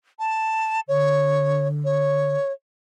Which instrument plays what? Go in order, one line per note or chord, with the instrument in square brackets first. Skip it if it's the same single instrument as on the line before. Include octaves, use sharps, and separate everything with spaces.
[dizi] A5
[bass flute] D3 [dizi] C#5
[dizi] C#5